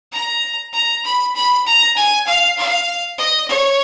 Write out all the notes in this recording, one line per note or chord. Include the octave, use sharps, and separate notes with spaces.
A#5
A#5
B5
B5
A#5
G#5
F5
F5
D#5
C#5